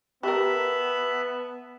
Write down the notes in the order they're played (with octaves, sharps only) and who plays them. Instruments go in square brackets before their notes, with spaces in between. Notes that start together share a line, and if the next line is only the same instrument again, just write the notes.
[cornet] B3 [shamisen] G4 A#4 [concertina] E5 A5 B5